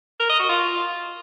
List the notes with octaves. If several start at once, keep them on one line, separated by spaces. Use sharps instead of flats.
A#4
D#5
F#4
F4